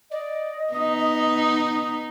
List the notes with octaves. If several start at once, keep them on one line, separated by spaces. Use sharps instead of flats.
D5 D#5
B3 D#4 D#6